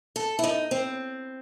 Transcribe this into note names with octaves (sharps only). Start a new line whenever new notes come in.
A4
E4
D#4
C4